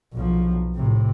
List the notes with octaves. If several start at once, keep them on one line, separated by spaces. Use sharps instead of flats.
B1 F3
A2 C3